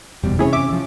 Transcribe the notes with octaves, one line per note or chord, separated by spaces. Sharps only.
F#1 E2 B2 G3
C3 E3 C#4 E4 G#4 C#5
E5 D6
F3